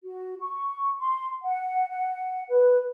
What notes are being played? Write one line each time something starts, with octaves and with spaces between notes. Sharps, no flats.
F#4
C#6
C6
F#5
F#5
B4